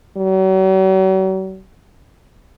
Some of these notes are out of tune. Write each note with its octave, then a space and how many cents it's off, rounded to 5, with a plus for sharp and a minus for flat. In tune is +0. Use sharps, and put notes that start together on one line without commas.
F#3 +45